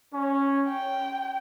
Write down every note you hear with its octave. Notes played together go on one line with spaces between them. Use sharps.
C#4
G5